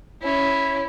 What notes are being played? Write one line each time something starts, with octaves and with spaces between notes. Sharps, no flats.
C#4 E4 C#5